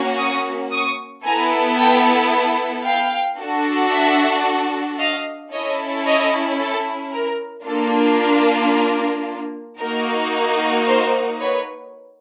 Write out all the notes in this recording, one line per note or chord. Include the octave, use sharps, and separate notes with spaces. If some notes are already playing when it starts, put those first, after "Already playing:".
Already playing: A#3 C#4 F#4
C#6 D#6
C#6 D#6
B3 E4 A4 G#5 A#5
G5 A5
F5 G5
D4 F#4 A4
E5 F#5
D#5 F5
C#4 E4 A4 C#5 D#5
C#5 D#5
A4
A#4
A#3 D4 F4 A4
A#4
A#4
A#3 D#4 F#4 A#4
A#4 C5
B4 C#5